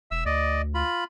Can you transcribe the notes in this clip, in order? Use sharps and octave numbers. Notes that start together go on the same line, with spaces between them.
E1 E5 E6
D2 D5 D#5
F4 B5